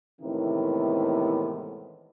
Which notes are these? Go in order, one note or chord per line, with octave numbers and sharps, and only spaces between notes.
A2 C3 D#3 E3 G#3 B3